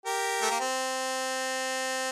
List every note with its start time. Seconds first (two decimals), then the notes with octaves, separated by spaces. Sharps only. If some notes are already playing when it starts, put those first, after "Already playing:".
0.06 G4 A#4
0.42 A3
0.51 A#3
0.60 C4